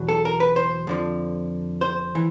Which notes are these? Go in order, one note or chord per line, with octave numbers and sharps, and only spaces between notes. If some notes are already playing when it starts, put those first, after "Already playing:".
Already playing: E2 B2 F#3
A4
A#4
B4
C5
F2 D3 F3
C5
E3